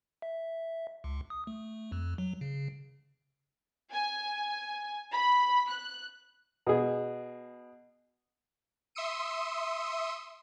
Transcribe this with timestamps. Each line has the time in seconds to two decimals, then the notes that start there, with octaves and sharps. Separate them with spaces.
0.22 E5
1.04 C#2
1.30 D#6
1.47 A3
1.92 F2
2.18 F#3
2.41 C#3
3.92 G#5
5.12 B5
5.68 F#6
6.66 B2 G#4
8.95 E5 C6 D#6 E6 C#7 D#7